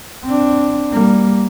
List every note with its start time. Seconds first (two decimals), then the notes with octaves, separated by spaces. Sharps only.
0.24 C4 D4
0.93 G3 A#3